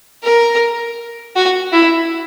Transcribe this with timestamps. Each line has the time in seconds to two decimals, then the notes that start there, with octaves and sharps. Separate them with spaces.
0.24 A#4
1.36 F#4
1.73 E4